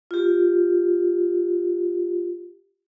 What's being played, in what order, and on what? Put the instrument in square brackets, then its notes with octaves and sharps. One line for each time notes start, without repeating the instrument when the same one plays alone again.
[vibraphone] F4 G4